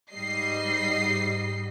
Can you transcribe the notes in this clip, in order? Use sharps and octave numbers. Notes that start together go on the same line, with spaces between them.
G#2 G3 D#5 C7